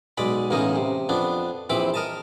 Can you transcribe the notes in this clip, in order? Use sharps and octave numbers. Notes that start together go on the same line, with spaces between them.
B1 G#3 D5 B5
A1 E2 C#3 A#3 D#4 D#5
C3
F2 B3 D4
A#1 E3 C4 B5 D6
A#4 D#5 A5